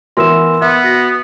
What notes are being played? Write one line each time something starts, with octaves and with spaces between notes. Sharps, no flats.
E3 B3 A#4 C6 E6 E7
B3 E5
F#4 A#6